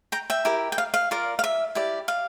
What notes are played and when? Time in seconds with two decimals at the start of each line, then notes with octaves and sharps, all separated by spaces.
0.12 G5 A#5
0.30 E5 G5
0.45 E4 G4 A#4
0.72 G5
0.78 F5
0.94 F5
1.11 F4 A#4 D5
1.39 F5
1.44 E5
1.75 E4 G4 D5
2.08 F5